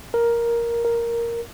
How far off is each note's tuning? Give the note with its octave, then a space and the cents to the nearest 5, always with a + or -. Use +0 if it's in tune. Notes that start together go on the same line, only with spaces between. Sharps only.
A#4 +5
A#4 +0